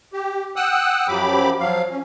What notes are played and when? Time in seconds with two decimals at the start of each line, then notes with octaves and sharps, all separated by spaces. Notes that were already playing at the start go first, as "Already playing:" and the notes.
0.13 G4
0.56 F#5 G5 D#6 E6 F#6
1.08 F#2 F3 F#3 G4 B5 D6
1.60 F3 F#3 F5
1.90 C#4